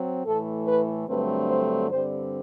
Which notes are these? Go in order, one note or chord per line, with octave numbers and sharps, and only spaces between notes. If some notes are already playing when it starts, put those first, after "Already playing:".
Already playing: F#3 C4
A2 E3 A3 A4
B4
G2 D3 F#3 A3 C4 B4
C5
G2 D3 G3 C4 C5